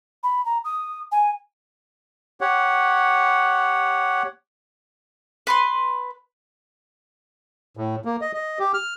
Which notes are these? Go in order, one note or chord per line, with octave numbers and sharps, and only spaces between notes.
B5
A#5
D#6
G#5
G4 C#5 F#5
B4 B5 C6
A2
A#3
D#5
D#5
G4
F6